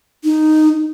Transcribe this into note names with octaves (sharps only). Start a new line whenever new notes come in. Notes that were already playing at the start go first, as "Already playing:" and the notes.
D#4